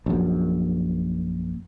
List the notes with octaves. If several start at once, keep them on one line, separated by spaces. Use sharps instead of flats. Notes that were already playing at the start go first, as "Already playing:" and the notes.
A#1 F#2